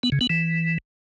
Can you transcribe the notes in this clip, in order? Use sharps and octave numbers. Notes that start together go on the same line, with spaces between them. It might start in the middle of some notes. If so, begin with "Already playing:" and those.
B3
C#3
B3
E3